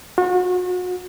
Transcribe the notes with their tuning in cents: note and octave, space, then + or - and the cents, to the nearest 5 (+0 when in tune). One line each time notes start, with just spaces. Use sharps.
F#4 -35